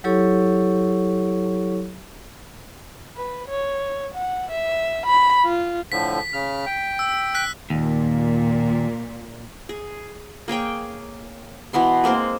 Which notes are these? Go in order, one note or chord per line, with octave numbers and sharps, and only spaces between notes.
F#3 E4 G4 A4 C#5 C#6
B4
C#5
F#5
E5
B5
F4
A2 D3 F3 B6
C#3 F6
G5
E6
F#6 B6
D#2 A#2
G#4
A#3 G#4 C#5 G5
B2 E3 B3 C6
G#3 A#3 C4 C5